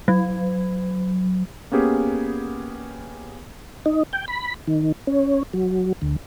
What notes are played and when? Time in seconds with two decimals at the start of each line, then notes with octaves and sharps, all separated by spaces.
0.08 F#3
1.72 A#3 B3 C#4 G4 G#4
3.86 D#4
4.13 G5
4.28 B5
4.67 D#3
5.07 C#4
5.53 F#3
6.02 D2